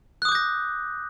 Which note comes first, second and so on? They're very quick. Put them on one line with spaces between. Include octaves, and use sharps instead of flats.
F#6 D#6 D6 G6 A#6